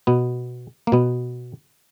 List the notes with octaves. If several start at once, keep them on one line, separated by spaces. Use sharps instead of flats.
B2 B3
A#3
B2 B3